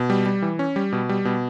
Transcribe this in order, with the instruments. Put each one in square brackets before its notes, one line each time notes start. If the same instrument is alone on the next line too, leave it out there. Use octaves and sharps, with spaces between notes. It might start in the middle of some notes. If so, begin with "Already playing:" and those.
Already playing: [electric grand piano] B2
G3
G3
E3
C#4
G3
B2
G3
B2